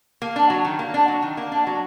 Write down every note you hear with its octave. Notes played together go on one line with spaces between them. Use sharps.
A#3
D4
F#3
D#3
A#3
D4
F#3
D#3
A#3
D4
F#3